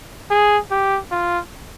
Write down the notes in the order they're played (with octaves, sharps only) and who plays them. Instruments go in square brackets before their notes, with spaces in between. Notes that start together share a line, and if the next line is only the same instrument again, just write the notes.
[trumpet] G#4
G4
F4